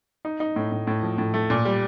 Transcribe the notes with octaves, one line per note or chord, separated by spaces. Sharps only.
D#4
D#4
A2
A2
A2
F3
A2
A3
A#2
G3